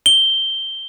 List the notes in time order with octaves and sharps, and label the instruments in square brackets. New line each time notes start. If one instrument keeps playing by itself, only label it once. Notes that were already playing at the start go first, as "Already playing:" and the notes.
[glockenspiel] G7